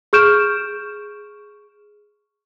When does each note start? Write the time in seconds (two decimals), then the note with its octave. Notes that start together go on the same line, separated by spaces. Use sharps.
0.13 G#4 C#6 F6 G6 D7 E7